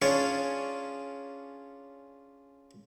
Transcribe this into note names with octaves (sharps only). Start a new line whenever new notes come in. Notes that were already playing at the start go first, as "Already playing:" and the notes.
C#4 D4 F4 G#4 C#5 D5